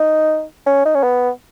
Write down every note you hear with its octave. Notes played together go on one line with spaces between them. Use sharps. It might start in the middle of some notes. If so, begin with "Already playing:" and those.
Already playing: D#4
C#4
D#4
C#4
B3